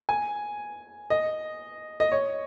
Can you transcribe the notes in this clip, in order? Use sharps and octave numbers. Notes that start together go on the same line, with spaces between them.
G#5
D#5
D#5
C#5